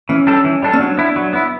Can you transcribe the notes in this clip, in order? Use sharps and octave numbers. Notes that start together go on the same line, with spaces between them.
E3 C#4
G3 D4 A4
E3
G3 D4 A4
C#4
F#3 D4
B3 E4
F#3
B3 E4